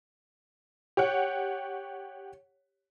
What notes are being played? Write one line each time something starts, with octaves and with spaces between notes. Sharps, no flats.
G4 C#5 F#5